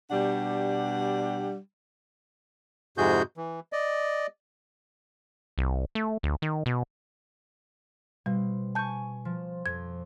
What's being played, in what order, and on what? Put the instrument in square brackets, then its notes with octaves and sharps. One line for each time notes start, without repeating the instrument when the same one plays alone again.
[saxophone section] B2 G3 D4 G4 F#5
[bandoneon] F2 G#2 C3 F#4 G#4 G6
E3
D5 D#5
[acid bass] C2
A3
D2
D#3
B2
[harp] B2 C4 [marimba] G3
[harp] G#5 C#6 [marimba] A5 G6
[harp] F3
[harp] F2 [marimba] G#6